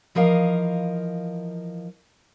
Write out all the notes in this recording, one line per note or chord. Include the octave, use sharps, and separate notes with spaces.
E3 F3 A#4 D#5 F5